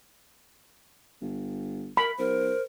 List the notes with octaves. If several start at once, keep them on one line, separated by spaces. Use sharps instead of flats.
G1
A#4 B5
C2 A#4 C5